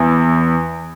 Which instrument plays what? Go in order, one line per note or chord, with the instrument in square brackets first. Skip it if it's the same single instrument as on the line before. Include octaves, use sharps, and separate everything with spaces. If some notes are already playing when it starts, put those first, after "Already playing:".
Already playing: [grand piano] E2